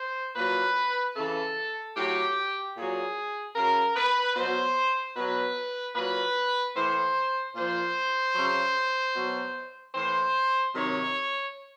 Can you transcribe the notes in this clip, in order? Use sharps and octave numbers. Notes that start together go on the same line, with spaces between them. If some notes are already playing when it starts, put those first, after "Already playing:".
Already playing: C5
A#2 F#3 B4
C#3 E3 A4
A2 F#3 G4
A#2 F#3 G#4
C#3 F#3 A#4
B4
B2 F#3 C5
B2 F#3 B4
A#2 F#3 B4
A2 E3 C5
A#2 F3 C5
C#3 F#3
B2 F#3
A2 E3 C5
C3 D#3 F#3 C#5